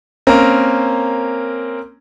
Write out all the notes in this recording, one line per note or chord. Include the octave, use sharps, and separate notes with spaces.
A#3 C4 C#4 A#4